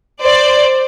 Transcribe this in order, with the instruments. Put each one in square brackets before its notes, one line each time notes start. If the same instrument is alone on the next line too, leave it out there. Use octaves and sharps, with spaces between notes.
[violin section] C5 D5